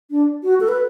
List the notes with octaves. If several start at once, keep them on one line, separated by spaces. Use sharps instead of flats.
D4
F#4
A4
B4